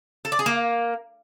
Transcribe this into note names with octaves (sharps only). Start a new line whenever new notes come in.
A4
D5
G#4
A#3